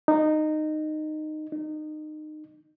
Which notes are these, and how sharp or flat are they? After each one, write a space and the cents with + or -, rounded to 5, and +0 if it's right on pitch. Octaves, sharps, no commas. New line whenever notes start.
D#4 -15
D#4 -25